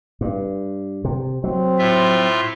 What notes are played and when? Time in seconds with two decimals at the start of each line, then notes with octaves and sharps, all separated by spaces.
0.21 G2
1.05 C3
1.44 F#3 C4
1.79 A2 F4 E5